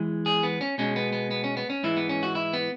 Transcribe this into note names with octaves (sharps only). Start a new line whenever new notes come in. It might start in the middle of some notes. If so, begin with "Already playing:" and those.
Already playing: E2 E3 G#3
G#4
B3
C#4
B2 G#3 C#4
B3
B3
B3
C#4
B3
C#4
G#2 E3 G#3 E4
B3
C#4
F#4
E4
B3